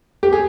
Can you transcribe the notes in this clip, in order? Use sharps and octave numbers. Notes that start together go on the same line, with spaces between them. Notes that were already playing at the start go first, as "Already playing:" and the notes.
G4
G#4